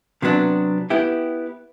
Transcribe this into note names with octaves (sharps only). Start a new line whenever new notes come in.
C3 F#3 B3 D4
B3 E4 G4